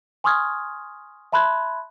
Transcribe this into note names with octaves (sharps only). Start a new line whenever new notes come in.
G#5 C6 C#6 D#6 F6 G#6
E5 A5 B5 C6 F#6 G#6